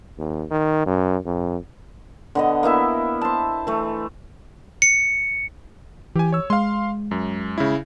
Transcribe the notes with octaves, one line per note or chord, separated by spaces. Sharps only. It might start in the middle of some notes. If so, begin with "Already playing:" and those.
D#2
D#3
F#2
F2
D3 B3 D#5
A#3 B3 E4 E5
C5 A5
E3 A3
C#7
E3 G4 G#5
C#5 E6
G#3 F5 C6
F#2
C#3 E4